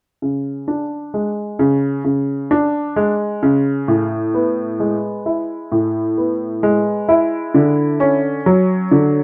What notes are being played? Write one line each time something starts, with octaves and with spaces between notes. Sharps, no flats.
C#3
D4
G#3
C#3
C#3
D4
G#3
C#3
A2
B3
G#3
E4
A2
B3
G#3
E4
D3
C#4
F#3
D3